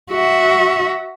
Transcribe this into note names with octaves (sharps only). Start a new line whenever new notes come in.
F#4 E5